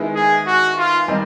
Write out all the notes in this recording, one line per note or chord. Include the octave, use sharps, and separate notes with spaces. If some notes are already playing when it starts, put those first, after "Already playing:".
Already playing: D#3 G#3 B3 E4
G#4
F#4
F4
D#3 G3 C4 D#4